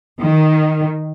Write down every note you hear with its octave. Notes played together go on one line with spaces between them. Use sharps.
D#3